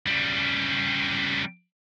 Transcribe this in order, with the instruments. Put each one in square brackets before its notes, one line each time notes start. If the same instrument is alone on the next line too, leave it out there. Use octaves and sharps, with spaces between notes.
[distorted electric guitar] C#3 G3